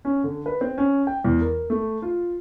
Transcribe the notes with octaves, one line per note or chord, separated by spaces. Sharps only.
C#4
D3
B4
C4
C#4
G5
E2
A#4
A3
F4